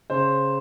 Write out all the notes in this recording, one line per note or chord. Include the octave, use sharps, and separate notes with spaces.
C#3 C5